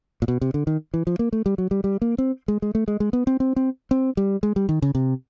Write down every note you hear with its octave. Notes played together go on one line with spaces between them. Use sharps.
A#2
B2
C3
D3
D#3
E3
F3
A#3
A3
G3
F#3
G3
G3
A#3
C4
G#3
G#3
A3
G#3
G#3
B3
C4
C4
C4
C4
G3
G#3
G3
D#3
C#3
C3